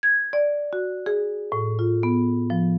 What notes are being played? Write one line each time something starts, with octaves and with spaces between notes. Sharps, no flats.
G#6
D5
F#4
G#4
A2
F4
B3
F3